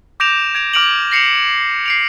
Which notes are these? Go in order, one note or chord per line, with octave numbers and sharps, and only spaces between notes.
D6 G6 A#6 D7 E7 F7
G#6 D7 F7
D6 F6 D7 F7 F#7
A#6 C7 C#7 E7 F7
C7 D7 F7